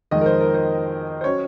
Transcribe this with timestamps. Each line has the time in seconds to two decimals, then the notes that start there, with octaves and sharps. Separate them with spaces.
0.11 F2 D#3 G#3 D#5
0.21 A#4
0.26 C5
0.41 A#4
0.54 C5
1.21 C5
1.24 F#3 C#4 C#5